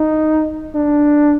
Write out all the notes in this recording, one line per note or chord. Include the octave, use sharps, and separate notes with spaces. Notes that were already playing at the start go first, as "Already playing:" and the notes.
Already playing: D#4
D4